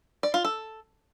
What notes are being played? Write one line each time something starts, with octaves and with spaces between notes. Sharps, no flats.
D5
F4
A4